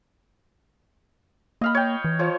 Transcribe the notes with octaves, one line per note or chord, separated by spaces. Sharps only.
A#3 D#5 F5 B5
C#5 G5
E3
F3 C#5 C#6